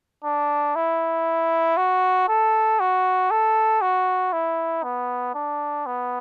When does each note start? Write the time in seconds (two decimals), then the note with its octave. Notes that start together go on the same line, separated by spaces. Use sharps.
0.25 D4
0.76 E4
1.77 F#4
2.29 A4
2.80 F#4
3.31 A4
3.82 F#4
4.33 E4
4.84 B3
5.35 D4
5.86 B3